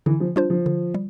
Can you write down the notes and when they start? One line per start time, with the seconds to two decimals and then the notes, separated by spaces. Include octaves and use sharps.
0.06 D3 E3
0.20 F3
0.36 G3 D4 F4 C5
0.50 F3
0.66 D3
0.94 G3